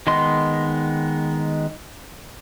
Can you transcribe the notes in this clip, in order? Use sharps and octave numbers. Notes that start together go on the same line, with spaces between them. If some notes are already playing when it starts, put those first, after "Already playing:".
D#3 G#3 B3 D#5 C6